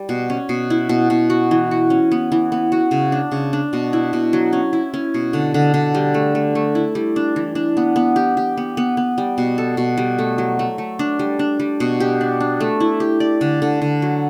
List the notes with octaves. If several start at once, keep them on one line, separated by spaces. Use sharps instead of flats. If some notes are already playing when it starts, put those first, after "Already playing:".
Already playing: G3
B2
C#4
B2
E4
B2
B2
F#4
E3
F#4
C#4
B3
E3
B3
F#4
C#3
D4
C#3
D4
B2
E4
B2
F#3
C#4
E4
C#4
B2
D3
D3
D3
G3
A3
A3
A3
E4
G3
D4
E3
D4
B3
B3
G4
G4
B3
B3
B3
G3
B2
A4
B2
G3
A3
F#3
A3
A3
D4
G3
D4
G3
B2
G4
D4
D4
A3
E4
G4
D5
D3
D3
D3
F#3